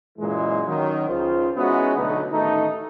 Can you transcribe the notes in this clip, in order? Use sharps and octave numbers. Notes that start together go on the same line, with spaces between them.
F#2 A#2 E3 G#3
D#3 F#3 C#4
C#2 F4 C5
G#3 B3 C#4 D#4 E4 F#4
B1 D3 A3 D#4 B4
A1 D#3 A3 D#4